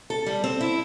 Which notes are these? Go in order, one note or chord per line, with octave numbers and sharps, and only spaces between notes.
A4
G3
C4
E4